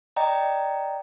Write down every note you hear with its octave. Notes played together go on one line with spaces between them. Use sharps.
D5 D#5 G5 A#5